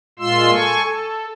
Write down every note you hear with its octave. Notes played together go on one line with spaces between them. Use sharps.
A#2 G#3 F4 C6 E6
A4 G#5 C#6
A4